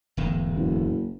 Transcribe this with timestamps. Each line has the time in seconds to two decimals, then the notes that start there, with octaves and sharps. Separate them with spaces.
0.17 D1 E2 G#2
0.55 F#1